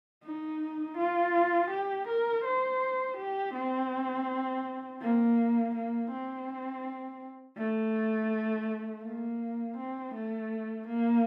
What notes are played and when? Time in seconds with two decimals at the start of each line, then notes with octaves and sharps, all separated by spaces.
0.24 D#4
0.98 F4
1.71 G4
2.08 A#4
2.45 C5
3.17 G4
3.54 C4
5.01 A#3
5.75 A#3
6.11 C4
7.58 A3
9.05 A#3
9.78 C4
10.15 A3
10.88 A#3